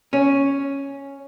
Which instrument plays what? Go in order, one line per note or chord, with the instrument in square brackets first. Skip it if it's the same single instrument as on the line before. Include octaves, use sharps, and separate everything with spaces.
[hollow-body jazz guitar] C#4